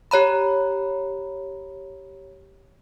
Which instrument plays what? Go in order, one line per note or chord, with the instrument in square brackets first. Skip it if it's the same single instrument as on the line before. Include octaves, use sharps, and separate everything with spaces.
[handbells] G4 C#5 A#5 B5